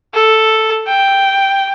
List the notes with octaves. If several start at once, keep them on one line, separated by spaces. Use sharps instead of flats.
A4
G5